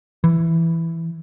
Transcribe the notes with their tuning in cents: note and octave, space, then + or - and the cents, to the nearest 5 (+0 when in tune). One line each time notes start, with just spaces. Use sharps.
E3 +5